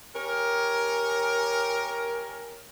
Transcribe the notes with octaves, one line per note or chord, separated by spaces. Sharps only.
C#4 G4 A#4